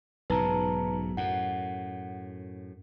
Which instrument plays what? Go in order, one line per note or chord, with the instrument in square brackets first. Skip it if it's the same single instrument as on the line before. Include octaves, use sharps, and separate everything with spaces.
[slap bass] B1 G#2 C#3 [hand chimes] B4 A5 A#5
[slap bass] F#2 A2 [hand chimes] F#5